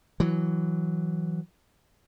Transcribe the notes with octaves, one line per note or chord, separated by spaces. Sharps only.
E3 F#3